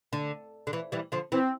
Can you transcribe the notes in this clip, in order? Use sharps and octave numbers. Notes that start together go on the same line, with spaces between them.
D3
D3
E3
E3 G3
D3 F3
E3 C4